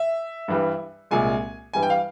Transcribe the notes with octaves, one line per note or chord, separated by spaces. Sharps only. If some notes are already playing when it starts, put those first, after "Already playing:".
Already playing: E5
G2 E3 G3
C2 A#2 G#3 G#5
G2 E3 G3 G#5
G5
F5